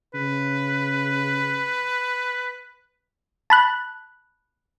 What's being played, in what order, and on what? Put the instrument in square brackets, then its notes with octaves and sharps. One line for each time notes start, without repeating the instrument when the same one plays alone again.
[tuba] C#3 [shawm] B4
[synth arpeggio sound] A5 B5 F#6